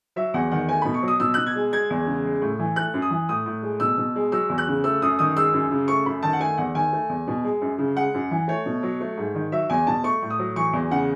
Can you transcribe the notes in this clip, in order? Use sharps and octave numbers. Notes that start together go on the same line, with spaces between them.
F#3 E5
E2 F#5
D#3 F#5
A3 G#5
B2 B5
C#6
F#3
D#6
B2 E6
B2 F#6
G#6
G#3
G#3 G#6
E2
C#3
G#3
A2
E3
A3 F#6
F#2
D#6
E3
A2 D#6
A2
G#3
B2 E6
B2
G#3
F#3 E6
E2
F#6
C#3
A3 E6
F#2 D#6
D#3 D#6
G#3 E6
F#2
C#3
A3 C#6
F#2 B5
D#3 A5
F#5
A3 G#5
E2 F#5
D#3 G#5
A3
E2
B2
G#3
F#2
C#3
G#3 F#5
F#2
E3
A3 C#5
B2
F#3
A3
G#2
D#3
F#3 E5
E2 G#5
B2 A5
A3 C#6
A2
D#6
F#3
E3 C#6
E2
C#3 F#5